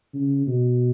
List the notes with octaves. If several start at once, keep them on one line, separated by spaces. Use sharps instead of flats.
C#3
B2